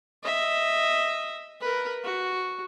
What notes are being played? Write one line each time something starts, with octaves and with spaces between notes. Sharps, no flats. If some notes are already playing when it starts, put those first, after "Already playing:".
D#5 E5
A#4 B4
F#4